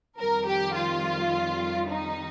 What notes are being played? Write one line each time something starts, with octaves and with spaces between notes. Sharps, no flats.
F2 D#3 G3 A#4
G4
F4
D#4